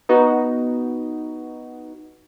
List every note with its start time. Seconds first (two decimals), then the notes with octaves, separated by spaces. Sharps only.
0.09 B3 D#4 F#4